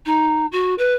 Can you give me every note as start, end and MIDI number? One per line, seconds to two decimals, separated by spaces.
0.05 0.46 63
0.51 0.74 66
0.78 0.93 71